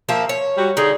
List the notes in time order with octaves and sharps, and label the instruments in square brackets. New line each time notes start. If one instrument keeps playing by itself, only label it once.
[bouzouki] F3 A#3 E5
C#5
[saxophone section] G3 F#4
[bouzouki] D3 [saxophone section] D#4 G#4